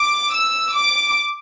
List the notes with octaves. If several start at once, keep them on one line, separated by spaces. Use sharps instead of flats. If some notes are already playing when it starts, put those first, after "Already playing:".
Already playing: D6
E6
D6